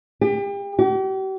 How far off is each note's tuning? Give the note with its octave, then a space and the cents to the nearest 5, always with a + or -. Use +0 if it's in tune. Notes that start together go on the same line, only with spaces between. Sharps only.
G4 +35
G4 -40